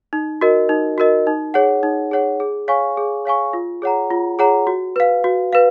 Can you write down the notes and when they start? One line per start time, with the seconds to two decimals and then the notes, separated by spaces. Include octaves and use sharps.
0.13 D#4
0.41 F#4 A#4 D#5
0.69 D#4
0.98 F#4 A#4 D#5
1.27 D#4
1.54 G#4 C#5 F#5
1.83 D#4
2.11 G#4 C#5 F#5
2.40 G#4
2.68 C#5 F5 G#5 C#6
2.97 G#4
3.25 C#5 F5 G#5 C#6
3.53 F4
3.82 G#4 C#5 F#5 A#5
4.11 F4
4.39 G#4 C#5 F#5 A#5
4.67 F#4
4.96 B4 F5
5.24 F#4
5.53 B4 F5